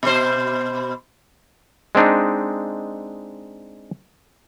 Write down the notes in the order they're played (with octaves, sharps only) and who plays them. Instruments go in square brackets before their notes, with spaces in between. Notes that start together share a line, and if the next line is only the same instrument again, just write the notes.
[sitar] B2 C5
[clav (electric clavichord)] G#3 C4 D4 D#4